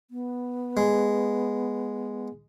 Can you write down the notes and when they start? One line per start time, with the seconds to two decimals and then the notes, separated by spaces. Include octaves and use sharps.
0.11 B3
0.77 G#3